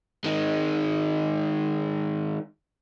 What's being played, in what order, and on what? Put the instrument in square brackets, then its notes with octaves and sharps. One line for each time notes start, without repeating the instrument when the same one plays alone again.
[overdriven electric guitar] D#3 G#3